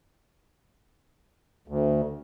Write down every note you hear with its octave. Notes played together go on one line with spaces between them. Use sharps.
D2